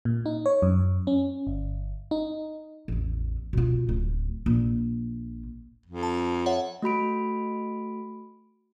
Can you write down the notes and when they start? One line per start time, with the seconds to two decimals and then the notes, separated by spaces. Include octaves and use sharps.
0.05 A#2
0.26 D#4
0.46 C#5
0.62 F#2
1.07 C#4
1.47 G1
2.11 D#4
2.88 A1 E2
3.53 B2 F4
3.89 D1
4.46 A#1
5.86 F2
6.03 A5
6.46 C#5 E5 F#5
6.82 A3 F#4 B5 D7